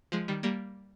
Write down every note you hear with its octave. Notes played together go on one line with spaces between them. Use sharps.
F3 G#3
D#3 G3
G3 A#3